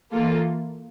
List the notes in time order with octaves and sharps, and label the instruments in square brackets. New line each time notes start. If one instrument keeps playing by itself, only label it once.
[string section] E3 A#3 F4 A4